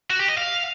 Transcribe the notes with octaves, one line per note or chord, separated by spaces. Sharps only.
F#4
G4
D#5
F5